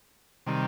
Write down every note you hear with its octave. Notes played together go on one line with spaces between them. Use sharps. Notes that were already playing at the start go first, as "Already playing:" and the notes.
C3 D#3 G3